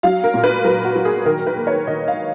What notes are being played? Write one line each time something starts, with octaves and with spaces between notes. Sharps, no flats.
F#3 F5
A#4
A#2
B4
F#3 A#4
F#4
F#3
G#4
D#3 A#4
B4
A#3
C#5
D#3 D#5
F5